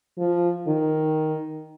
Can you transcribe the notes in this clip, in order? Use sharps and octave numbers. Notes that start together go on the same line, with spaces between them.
F3
D#3